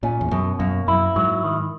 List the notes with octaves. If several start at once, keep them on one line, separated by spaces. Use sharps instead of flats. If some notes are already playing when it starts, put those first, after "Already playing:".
A#2 C#4
E2
F#2 B2
F#2 A#3
F#2 E4
G#2 F#3
D#3